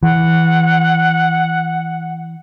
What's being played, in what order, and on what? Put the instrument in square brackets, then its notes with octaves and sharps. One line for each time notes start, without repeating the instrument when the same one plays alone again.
[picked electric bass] E3 [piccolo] F#5